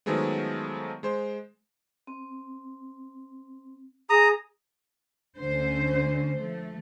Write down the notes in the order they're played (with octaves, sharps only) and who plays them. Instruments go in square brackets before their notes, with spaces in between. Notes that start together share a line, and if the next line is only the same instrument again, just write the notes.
[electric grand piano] D#3 F3 F#3 G#3 A3 B3
G#3 C5
[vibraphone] C4
[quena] G#4 [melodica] A#5 D#6
[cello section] D2 D3 C#4 C5
F3 A3